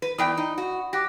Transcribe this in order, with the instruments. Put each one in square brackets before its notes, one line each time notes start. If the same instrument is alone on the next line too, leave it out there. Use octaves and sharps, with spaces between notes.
[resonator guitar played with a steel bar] B4
[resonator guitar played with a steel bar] E2 E3 G5 [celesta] D5 B5 D#6
[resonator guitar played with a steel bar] D#4
F#4
[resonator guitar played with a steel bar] G4 [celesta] D6 F#6 A#6